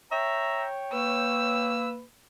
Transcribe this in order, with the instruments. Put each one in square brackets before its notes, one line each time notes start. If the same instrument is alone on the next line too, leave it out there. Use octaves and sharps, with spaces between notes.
[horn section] C#5 G5 [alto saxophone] E5 [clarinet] A#5
[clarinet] A#3 [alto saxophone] B4 [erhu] E6